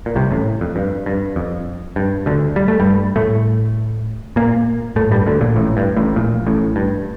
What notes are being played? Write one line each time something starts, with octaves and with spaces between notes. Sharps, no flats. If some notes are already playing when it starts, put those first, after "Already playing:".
A#2
C2 C3
A1 A2
F2
G2
G2
F2
G2
D2 D3
G3
A3
G2 G3
A2 A3
A#2 A#3
A2 A3
G2 G3
D2 D3
A#1 A#2
A1 A2
G2
A1 A2
A#1 A#2
A1 A2
G2